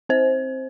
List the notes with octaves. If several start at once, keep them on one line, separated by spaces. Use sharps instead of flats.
C4 C5